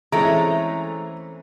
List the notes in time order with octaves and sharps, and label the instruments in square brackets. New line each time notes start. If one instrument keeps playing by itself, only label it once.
[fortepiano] E3 C4 C#4 [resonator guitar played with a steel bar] G#3 A3 [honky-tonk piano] A#5